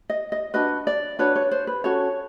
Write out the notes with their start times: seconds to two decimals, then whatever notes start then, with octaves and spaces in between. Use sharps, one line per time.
0.10 D#5
0.32 D#5
0.54 D4 F#4 B4 D#5
0.87 D5
1.19 D4 F#4 B4 C#5
1.36 C#5
1.51 C5
1.67 B4
1.84 C#4 F#4 A4 C#5